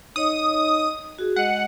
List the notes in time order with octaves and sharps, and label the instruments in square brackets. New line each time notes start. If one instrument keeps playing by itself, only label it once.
[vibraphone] D#4 C#5 D#5 [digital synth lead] D#6
[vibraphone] F#4 G#4
[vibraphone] G#3 D#5 [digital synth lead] F#5